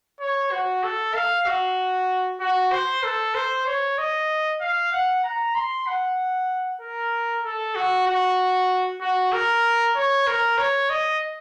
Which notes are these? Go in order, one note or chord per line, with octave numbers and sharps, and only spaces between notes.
C#5
F#4
A4
F5
F#4
F#4
C5
A4
C5
C#5
D#5
F5
F#5
A#5
C6
F#5
A#4
A4
F#4
F#4
F#4
A#4
C#5
A#4
C#5
D#5